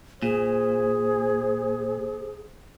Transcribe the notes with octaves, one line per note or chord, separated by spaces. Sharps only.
A#2 G#4 C5